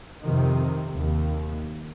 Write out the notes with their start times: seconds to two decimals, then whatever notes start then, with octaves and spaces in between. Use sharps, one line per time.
0.23 F2 C3 D#3
0.96 D#2